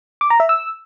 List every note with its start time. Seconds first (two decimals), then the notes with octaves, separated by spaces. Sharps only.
0.21 D6
0.30 A#5
0.40 E5
0.49 E6